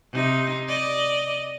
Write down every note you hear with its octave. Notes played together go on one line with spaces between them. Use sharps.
C3 D#4
D5 D#5